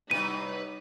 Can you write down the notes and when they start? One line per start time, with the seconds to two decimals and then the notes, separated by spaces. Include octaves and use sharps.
0.11 C3 F#3 G3 D#4 E4 B4 D#7